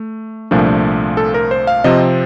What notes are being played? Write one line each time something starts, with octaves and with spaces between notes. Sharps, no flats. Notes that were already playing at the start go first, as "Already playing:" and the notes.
Already playing: A3
C2 A#2 F3 A3 D4
A4
A#4
C5
F5
C3 F3 C4 D#5